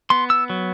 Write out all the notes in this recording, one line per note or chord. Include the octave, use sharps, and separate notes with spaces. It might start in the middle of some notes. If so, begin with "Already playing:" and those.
B3 C6
E6
F#3